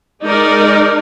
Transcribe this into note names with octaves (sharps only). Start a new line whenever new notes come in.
G#3 D#4 A#4 D5